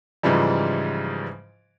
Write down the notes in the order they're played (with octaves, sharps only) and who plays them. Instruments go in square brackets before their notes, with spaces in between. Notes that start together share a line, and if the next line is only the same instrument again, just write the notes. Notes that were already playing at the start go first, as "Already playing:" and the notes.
[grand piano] G#2 C#3 E3 F3 G3